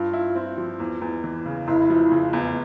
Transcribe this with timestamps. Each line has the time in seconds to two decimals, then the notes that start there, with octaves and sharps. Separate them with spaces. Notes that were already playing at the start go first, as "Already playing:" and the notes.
Already playing: G2 F4
0.13 E4
0.35 C4
0.57 F3
0.80 E2
1.02 E2
1.24 E3
1.46 C#3
1.68 F1 E4
1.90 F3
2.12 C#3
2.33 E2